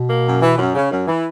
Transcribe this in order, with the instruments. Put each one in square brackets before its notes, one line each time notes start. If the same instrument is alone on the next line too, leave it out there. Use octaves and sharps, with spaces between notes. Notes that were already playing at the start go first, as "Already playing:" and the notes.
Already playing: [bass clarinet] B2
[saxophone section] A#3
F#2
E3
F#2
C#3
F#2
E3